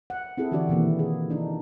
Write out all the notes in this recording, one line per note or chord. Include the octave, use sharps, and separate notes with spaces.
F#5
C4 E4 G#4 A4
D3 E3 D4 F#4 G4 D5
B2 D#3 E3 A#3
G#4
D4 D#4